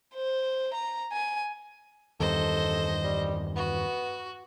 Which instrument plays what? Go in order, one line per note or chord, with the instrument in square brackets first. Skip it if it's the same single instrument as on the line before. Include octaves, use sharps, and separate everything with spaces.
[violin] C5
A#5
G#5
[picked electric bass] E2 G2 D#3 [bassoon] A4 [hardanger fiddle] C5 D#5
[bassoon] G3
[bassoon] B3 [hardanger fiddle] F#4